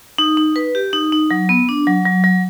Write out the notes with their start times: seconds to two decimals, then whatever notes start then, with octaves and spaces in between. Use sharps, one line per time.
0.18 D#4
0.37 D#4
0.56 B4
0.75 G4
0.93 D#4
1.12 D#4
1.31 F#3
1.49 B3
1.69 D4
1.87 F#3
2.06 F#3
2.24 F#3